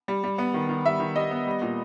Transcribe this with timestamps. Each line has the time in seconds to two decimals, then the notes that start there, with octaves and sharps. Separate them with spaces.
0.08 G3
0.24 G3
0.38 B3
0.54 D#3
0.69 D#3
0.85 G3 E5
1.00 D#3
1.15 G3 D#5
1.31 B3
1.47 G3
1.62 A#2